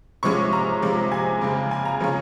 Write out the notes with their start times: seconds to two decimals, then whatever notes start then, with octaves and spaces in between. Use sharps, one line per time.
0.23 C3 F3 G#3 C#4 C#6
0.53 A#5
0.83 C3 F3 G#3
1.12 G#5
1.41 F2 C#3 G#3
1.71 G#5
1.85 A#5
2.00 C#3 F3 G#3 C#4